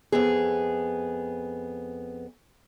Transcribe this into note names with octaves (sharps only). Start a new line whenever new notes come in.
F2 B3 G#4